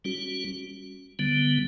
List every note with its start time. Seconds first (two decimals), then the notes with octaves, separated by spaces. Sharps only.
0.05 G3 C#4 F#4
1.19 D3 G3 B3